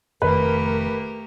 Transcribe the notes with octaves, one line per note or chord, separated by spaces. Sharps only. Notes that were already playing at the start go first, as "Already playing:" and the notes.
F1 F2 D#3 A3 A#3 G4 A#4 B4